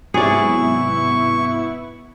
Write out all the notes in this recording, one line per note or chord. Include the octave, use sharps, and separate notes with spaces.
G#2 C3 F#3 B3 E4 G#4 D5 C#6